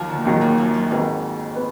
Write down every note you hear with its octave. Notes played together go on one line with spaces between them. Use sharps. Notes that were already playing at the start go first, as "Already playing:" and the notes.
Already playing: D#2 D#3 F3 F#3
D3
A#2
D#2 G#2 D#3 F#3
A#2
F#2
F#2
F2 G#2 D#3 F#3 B3
B3